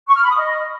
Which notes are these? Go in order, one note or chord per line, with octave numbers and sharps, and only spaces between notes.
C#6
F6
B5
D#6
D#5